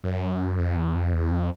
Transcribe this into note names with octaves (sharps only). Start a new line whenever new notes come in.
F#2
F2
E2
F2
E2
F2